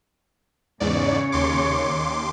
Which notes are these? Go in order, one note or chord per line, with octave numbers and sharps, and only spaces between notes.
E2 G#2 C#3 C#5 D5
D#2 C6 D6